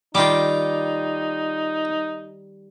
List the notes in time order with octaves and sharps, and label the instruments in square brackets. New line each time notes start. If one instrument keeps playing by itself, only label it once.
[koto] D#3 G3 [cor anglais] D#4 [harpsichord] F4 G5 D6